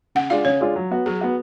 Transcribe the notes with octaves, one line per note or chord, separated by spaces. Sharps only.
C#3 F#5
G#3 D4 F4 F5
C#3 C#5
G#3 D4 F4
F#3
B3 F#4
F#3 G#4
B3 F#4